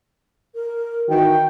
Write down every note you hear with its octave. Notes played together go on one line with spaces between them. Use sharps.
A#4
D#3 E3 F#4 G5